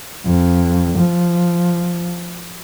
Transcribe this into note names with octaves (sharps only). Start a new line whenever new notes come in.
F2
F3